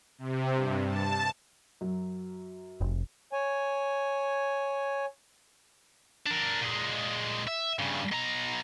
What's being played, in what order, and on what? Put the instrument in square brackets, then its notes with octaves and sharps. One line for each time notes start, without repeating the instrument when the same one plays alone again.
[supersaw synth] C3
G2
A5
[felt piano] F#2 F#3
[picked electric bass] F1
[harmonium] C#5 G#5
[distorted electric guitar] D4 A#4
A#2 G#3
E5
G2 C#3
B2 A#5